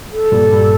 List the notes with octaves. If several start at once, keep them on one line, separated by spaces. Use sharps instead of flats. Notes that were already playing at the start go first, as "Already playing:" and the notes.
A4
G2 A#2
G2